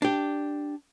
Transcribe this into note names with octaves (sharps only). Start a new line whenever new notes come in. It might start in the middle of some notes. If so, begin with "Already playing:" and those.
D4 G4